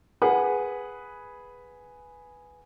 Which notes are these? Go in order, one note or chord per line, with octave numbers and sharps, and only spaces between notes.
G#4 B4 F#5